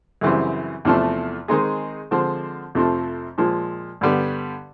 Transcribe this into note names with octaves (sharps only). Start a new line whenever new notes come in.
F#2 C#3 E3 G3 C4
E2 C3 F3 A3
D#3 G#3 C4 D#4 G#4
D3 F3 G#3 C4
F2 C3 F3 A3 C4
A#2 F3 G#3
G2 D3 G3 B3